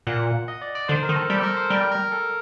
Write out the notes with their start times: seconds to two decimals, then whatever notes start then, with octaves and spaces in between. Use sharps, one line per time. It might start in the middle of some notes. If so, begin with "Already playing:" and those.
0.07 A#2 F#5
0.48 D#5
0.62 D5
0.75 D5
0.88 D3 C5
1.03 A#4
1.09 D#3
1.16 A4
1.30 G3 A4
1.43 A#4
1.57 C5
1.70 G3 A#4
1.92 A#4
2.12 A4